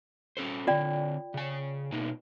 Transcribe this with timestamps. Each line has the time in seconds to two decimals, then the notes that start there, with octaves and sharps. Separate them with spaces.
0.37 C#4 A4 C5
0.67 D3 C4 F4 D5 G5
1.34 C#3 G#5
1.92 B2 A#3 D#4